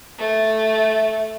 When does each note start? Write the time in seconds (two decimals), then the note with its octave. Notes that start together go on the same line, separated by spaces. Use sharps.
0.18 A3